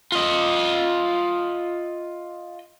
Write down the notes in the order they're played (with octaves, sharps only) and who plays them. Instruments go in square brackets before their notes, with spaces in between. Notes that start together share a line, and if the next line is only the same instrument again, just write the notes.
[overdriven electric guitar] F4 D#5